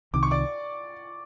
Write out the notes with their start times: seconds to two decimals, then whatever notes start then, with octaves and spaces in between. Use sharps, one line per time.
0.13 C2 C3 D#3 D6
0.23 C#6
0.31 D5 D6